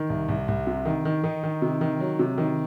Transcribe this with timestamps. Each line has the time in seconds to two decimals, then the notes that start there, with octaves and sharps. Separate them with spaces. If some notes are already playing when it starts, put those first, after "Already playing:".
Already playing: D#3
0.10 C2
0.29 C2
0.48 C2
0.67 C3
0.85 D#3
1.05 D#3
1.24 D#3 D#4
1.43 D#3
1.62 C3
1.81 D#3
2.00 F#3
2.19 C3
2.38 D#3